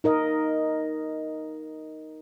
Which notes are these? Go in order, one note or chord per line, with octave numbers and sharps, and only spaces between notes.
D#4 A#4 D#5